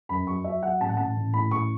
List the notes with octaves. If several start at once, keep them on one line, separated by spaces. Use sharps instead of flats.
F#2 B5
F#3 C#6
F#3 E5
F#3 F#5
A1 A5
F#5
A1 A5
A1
A2 B5
A1 C#6